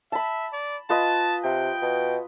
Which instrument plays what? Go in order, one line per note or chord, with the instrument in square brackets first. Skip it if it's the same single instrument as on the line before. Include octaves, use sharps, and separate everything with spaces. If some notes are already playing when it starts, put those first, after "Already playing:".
[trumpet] E5 [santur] A5 B5
[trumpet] D5
[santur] F4 B4 D#5 [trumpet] A5
[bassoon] C3 [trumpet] G5
[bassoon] B2